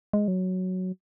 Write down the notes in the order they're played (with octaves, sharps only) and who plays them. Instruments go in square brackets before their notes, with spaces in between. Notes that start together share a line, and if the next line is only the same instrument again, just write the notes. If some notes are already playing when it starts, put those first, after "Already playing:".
[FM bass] G#3
F#3